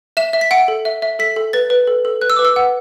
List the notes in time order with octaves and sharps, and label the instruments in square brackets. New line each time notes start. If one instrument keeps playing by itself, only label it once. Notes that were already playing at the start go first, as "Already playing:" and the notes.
[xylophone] E5 E7
E5
B6
F#5 D7
A4
E5
E5
A4 B6
A4
B4 A6
B4
A4
A4
B4 F#6
E6
D6
B4
E6
F#5